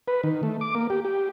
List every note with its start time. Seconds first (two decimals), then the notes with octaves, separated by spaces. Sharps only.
0.08 B4
0.23 D#3
0.43 A3
0.61 D6
0.75 A#3
0.90 G4
1.05 G4